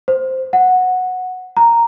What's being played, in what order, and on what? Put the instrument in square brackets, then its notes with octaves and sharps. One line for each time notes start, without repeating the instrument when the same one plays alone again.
[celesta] C5
F#5
A#5